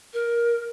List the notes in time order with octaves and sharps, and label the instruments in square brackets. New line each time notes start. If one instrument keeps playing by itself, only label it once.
[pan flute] A#4